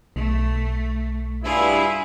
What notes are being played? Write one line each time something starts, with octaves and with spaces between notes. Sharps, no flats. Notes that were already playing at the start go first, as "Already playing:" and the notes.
B1 A3
G2 E4 F4 G#4